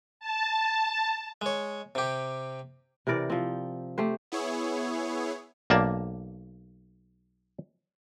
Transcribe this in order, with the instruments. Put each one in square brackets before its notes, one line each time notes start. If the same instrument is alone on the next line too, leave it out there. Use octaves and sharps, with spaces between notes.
[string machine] A5
[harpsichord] G#3 C#5
C3 G4
[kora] C3 E3 A#4 D5
F3 C4
A3 G4 C5
[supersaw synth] B3 E4 G#4 C#5
[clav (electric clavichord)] B1 A#3 D5 A5